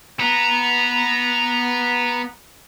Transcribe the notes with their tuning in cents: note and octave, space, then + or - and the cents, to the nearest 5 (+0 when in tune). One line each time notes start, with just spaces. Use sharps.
B3 -10 A#5 +0